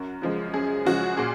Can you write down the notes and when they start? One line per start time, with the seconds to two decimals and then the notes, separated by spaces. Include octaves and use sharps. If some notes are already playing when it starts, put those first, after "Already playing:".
Already playing: F#2 F#4 A#4
0.22 C#3 F3 G#3
0.54 F#2 G#4
0.85 C#3 F3 G#3 F#4
1.17 A#2 G#4